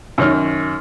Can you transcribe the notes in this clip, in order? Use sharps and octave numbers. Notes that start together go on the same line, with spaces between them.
F#2 D#3 C#5 F6